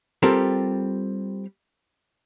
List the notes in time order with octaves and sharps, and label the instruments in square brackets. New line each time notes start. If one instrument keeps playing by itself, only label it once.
[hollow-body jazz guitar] G3 C4 F4 G4 A4 A#4